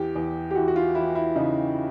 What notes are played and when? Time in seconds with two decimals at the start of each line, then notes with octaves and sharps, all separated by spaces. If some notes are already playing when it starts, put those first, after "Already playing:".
Already playing: E2 G4
0.15 E2
0.51 G4
0.55 E3 F#4
0.68 F#4
0.76 F4
0.95 E3 E4
1.15 E4
1.36 C#3 D#4